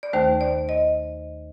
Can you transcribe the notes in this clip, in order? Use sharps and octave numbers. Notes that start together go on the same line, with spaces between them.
D5
D#2 D#3 A3 C5
D5
D#5